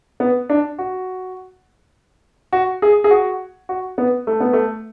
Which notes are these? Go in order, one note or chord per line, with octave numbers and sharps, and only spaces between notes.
B3
D4
F#4
F#4
G#4
G#4
F#4
F#4
B3
A3
B3
A3